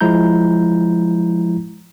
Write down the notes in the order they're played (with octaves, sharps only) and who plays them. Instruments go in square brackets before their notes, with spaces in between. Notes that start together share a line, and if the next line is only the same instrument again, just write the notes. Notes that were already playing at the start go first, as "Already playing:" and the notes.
[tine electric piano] F3 G#3 E4 A#5 G6